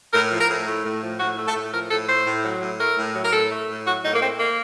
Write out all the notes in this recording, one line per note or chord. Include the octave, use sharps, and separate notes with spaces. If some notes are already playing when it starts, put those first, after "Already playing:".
A2 A#4
F3
A#4
A2
A3
A2
F3
A2 F#4
A3
A4
A2
F3 A#4
A2 A4
A3 C5
A2
F#3
A2
A3 A#4
A2
F#3
A#4
A2 A4
A3
A2
F#3 F#4
A2 D#4
A#3
A3 C4
A#3